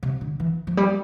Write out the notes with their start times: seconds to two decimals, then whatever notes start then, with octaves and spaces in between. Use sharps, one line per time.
0.03 C3
0.21 D3
0.40 E3
0.67 F3
0.77 G3